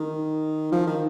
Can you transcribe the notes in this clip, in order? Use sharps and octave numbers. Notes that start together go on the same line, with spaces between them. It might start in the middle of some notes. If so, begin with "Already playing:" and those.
Already playing: D#3
F3
D#3